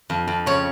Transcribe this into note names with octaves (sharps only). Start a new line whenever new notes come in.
F2
F2
C#3 C#5